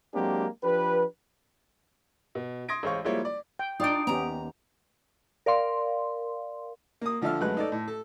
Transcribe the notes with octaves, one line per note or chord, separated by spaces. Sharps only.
F#3 G#3 A#3 C4 D4 G4
F3 D4 G4 B4
B2
C6 D#6 G#6 A#6 D7
A1 G#3 C5 C#5 F5 C#6
F3 G3 G#3 A#3 E4 C#5
D5
G5
D4 D#4 F4 D5 G5 D#6 D7
D#2 B3 C#4 G4 A#5
A#4 D5 F5 C6
A#3 D#6
D3 F3 D4 A4 E5 F6
F#2 G#3 A3 B4 F#6
D#4 A4 D5
A2
A4